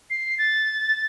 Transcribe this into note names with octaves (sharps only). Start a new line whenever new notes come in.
C7
A6